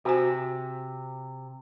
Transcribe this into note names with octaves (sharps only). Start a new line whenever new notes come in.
C3 F#4 C5 G#5